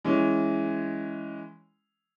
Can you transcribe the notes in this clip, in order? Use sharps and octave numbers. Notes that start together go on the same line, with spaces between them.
E3 G#3 C#4